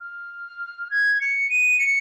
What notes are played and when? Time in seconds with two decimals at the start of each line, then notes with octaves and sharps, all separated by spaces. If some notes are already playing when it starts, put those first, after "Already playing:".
0.01 F6
0.91 G#6
1.21 C#7
1.50 D#7
1.79 C#7